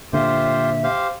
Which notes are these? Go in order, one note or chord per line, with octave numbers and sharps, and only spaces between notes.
A#2 D3 F4 G4 C5 E5
G4 C5 F5